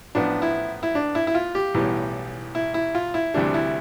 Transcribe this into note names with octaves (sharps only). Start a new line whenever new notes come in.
A1 A2 F3 B3 D4
E4
E4
D4
E4
E4
F4
G4
B1 A2 E3 G3 B3
E4
E4
F4
E4
D2 C3 E3 G3 D4
E4